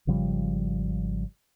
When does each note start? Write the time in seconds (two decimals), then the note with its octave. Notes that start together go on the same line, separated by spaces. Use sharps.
0.07 G#1 C#3 F3 G3